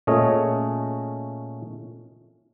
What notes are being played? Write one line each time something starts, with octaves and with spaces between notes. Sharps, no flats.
A#2 A3 C#4 G#4 D#5